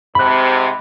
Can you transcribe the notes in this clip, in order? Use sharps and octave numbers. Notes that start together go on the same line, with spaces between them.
G#2 C3 B5 F#6